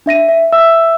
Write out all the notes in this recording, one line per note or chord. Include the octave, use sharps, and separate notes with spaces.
D4 E5 A#6 D#7
E5
E5 E6